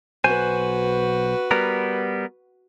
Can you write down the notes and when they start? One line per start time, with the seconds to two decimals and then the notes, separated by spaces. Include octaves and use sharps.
0.24 B1 F#4 B4 C5 G#5
1.51 G3 B3 A#4